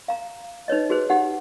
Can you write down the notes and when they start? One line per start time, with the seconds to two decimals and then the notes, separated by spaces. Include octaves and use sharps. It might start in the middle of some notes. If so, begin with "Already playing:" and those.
0.08 F5 A#5
0.68 D#4 B4 C#5 D#5
0.90 F#4 G#4 B4 C5
1.10 D#4 G4 F#5